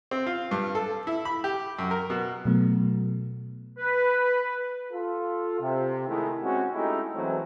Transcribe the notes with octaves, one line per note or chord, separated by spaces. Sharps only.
C4
F4
G2
A4
E4
B5
G4
F#2
A#4
B2
B2 F#3 A3 B3
B4
F4 A4
C3
D#3 G#3 A3 E4
G#3 C4 C#4 F#4
G#3 A3 C#4 D#4 E4 G4
E2 E3 F#3 G#3 A3 C4